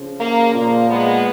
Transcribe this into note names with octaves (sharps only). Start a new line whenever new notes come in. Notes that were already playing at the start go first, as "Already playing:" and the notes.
Already playing: C#3 F3
A#3
A#2 F3 A#3
G#3 B3